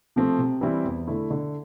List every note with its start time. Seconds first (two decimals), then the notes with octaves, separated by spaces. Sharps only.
0.16 C3 F3 A3 C4
0.39 C3
0.61 E3 G3 C4 E4
0.85 E2
1.07 D3 A3 E4
1.30 D3